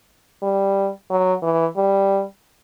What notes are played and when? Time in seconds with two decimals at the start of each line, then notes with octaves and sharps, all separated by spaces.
0.42 G3
1.10 F#3
1.43 E3
1.77 G3